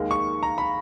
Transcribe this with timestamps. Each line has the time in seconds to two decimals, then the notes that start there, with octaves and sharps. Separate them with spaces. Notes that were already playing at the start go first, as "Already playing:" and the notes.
Already playing: D#2 D#3 G#3
0.11 C#6
0.43 A#5
0.58 B5